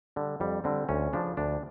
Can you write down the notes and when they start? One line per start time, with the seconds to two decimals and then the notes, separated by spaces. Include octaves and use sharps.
0.16 D3 G3
0.40 F2 G3
0.64 D3 G3 C4
0.89 D2 C#4
1.13 C#3 F3 D4
1.37 D2 D4